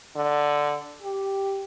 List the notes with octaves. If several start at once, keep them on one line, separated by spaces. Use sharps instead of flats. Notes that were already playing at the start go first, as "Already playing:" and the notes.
D3
G4